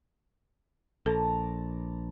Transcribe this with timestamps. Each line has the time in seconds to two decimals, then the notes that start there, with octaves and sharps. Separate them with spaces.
1.06 A#1 A4 D5 A5 A#5